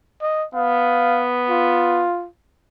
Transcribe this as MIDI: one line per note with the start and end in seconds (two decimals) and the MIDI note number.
0.21 0.45 75
0.55 2.06 59
0.55 1.25 77
1.50 2.27 65